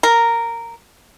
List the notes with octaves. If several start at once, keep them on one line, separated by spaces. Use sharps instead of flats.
A#4